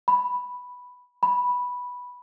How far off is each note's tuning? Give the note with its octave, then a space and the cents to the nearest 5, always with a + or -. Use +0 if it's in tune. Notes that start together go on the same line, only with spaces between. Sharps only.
B5 +0
B5 -5